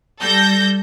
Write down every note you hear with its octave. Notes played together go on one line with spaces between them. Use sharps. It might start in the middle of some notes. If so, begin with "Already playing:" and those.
G3 A4 G6 A#6